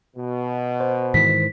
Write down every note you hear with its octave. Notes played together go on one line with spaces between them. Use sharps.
B2
C5
G#2 D#3 E3 B6